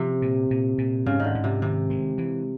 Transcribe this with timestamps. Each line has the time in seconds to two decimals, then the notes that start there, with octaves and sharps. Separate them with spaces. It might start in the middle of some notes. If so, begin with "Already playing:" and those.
Already playing: C3 F3
0.22 A#2
0.51 A#2
0.78 A#2
1.06 G#2 C#3
1.20 D3 D#3
1.35 G#2
1.44 C3
1.62 C3 D#3
1.90 G#3
2.18 E3